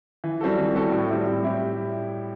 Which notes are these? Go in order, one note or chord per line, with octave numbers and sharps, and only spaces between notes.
E3
G3 C4 F#4 A4
E3
G3 C4 F#4 A4
A2
G3 C4 E4 G4
A2
G3 C4 E4 G4